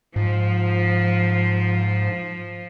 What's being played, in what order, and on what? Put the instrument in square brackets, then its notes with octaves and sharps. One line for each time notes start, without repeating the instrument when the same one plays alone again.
[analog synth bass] G#2 [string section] F3